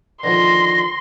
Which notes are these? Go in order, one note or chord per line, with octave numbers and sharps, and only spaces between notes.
D3 D#3 F3 C6 A#6